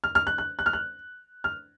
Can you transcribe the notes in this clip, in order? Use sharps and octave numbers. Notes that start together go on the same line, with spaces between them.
F6
F6
F#6
F#6
F#6
F6
F#6
F6